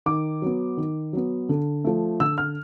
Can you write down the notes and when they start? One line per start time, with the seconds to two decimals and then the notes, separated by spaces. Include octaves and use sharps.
0.06 D#3 D6
0.42 F#3 B3
0.77 D#3
1.13 F#3 B3
1.49 D3
1.84 F3 A3
2.20 D3 E6
2.38 F6